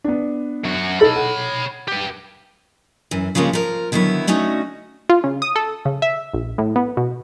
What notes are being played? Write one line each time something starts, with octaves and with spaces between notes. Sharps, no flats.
B3 D4
F#2 F#4
D#4 A4 C#5 B5 A6
F#5
G4 B4
F#2 E3
C#3 F3 G3 G#3 A#3 C#4
F3 A#4
D3 D#3 F#3 B3 E4
D3 A3 C#4 D#4 F#4
F4
C#3
D#6
A4
C#3
E5
A#1
A2
B3
B2